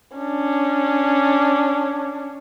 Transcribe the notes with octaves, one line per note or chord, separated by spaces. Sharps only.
C#4 D4